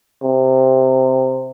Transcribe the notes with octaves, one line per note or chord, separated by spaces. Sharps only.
C3